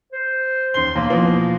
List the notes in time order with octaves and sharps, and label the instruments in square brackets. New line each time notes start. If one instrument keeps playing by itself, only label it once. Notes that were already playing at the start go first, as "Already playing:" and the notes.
[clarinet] C5
[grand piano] D#2 G7 [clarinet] C6
[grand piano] B1 [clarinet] A#3
[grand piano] B2 E3 F3